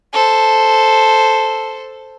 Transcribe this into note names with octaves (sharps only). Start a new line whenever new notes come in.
A4 C5